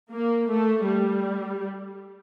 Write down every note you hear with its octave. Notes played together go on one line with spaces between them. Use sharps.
A#3
A3
G3